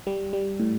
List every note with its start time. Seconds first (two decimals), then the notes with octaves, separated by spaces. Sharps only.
0.07 G3
0.33 G3
0.60 A2